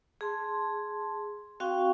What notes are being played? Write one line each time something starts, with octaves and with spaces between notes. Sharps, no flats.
G#4 A5 C6
C4 F#4 F5 G5 C#6